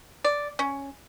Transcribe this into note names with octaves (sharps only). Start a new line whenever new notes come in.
D5
C#4